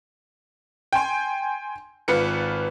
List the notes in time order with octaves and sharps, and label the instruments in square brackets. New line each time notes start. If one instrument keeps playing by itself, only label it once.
[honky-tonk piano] G5 G#5 C6
G#1 F4 B4 C#7